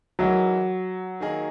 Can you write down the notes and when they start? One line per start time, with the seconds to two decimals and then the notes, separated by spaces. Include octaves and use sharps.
0.19 E3 F#3 G#3 D#4 A#4 E5
1.20 D#3 A#3 D#4 G#4